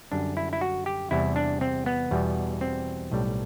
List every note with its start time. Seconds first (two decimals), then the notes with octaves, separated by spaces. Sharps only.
0.12 F#2 D3 G3 D4
0.37 E4
0.53 E4
0.61 F#4
0.86 G4
1.11 E2 C3 G3 E4
1.36 D4
1.61 C4
1.86 B3
2.11 E2 B2 G3
2.61 C4
3.11 B1 A2 G3